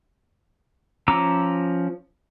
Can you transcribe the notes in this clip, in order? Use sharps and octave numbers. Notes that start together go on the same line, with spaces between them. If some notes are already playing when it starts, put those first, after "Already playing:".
F3 C#4 A#5 D6 E6